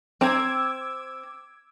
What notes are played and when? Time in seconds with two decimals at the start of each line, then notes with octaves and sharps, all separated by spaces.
0.21 C4 A#5 D6 E6 G#6